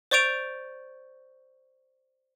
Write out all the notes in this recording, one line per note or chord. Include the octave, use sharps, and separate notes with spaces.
C5 D5 C#6 G6 D7 F7